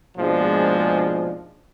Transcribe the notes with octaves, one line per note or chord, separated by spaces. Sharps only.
A#1 G#2 B2 F3 G#3 D4